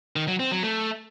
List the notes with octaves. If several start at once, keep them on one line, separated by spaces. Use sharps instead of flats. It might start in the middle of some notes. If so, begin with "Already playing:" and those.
D#3
F#3
C4
F#3
A3